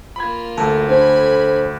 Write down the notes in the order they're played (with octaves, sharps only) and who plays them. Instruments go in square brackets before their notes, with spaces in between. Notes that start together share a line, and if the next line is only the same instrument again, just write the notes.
[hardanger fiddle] A#3 F4 [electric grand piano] B5 G#6
[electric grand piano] D2 [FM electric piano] A4
[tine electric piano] D4 C5 [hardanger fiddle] G#5 B5